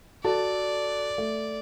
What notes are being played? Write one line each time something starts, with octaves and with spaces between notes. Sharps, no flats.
F#4 A4 D5 A5
A3